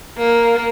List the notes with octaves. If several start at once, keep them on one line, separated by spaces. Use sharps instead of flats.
A#3